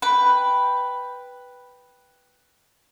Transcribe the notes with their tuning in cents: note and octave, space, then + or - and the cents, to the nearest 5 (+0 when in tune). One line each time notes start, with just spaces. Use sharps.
B4 +0 G5 +0